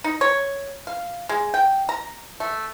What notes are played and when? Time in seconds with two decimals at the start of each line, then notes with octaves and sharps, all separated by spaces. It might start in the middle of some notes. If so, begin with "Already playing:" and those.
0.04 D#4
0.21 C#5
0.87 F5
1.29 G#3
1.54 G5
1.89 A#5
2.40 A3